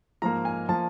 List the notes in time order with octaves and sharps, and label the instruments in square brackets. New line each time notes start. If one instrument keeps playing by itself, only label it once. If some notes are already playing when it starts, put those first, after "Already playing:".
[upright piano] G#2 F3 A#3 [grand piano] A#5
[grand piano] G#5
[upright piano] F3 A#3 [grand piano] A5